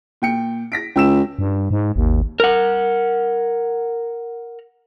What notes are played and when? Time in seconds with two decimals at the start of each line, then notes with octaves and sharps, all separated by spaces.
0.22 A#2 G5 C#7
0.72 A#6 B6 D7
0.96 C#2 G5 E6 E7
1.39 G2
1.71 G#2
1.96 G#1 D#2
2.40 A#4 F#5